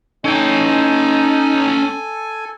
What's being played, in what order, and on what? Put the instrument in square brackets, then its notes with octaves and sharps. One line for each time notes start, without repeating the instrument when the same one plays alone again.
[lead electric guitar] C#4 G5 [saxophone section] D#4 [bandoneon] A4 G#5